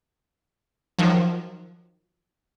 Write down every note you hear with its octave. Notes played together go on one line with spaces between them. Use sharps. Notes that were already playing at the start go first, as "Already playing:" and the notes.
D#3 F3 F#3